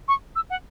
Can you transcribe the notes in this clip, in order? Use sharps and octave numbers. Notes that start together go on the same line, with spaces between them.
C#6
E6
F#5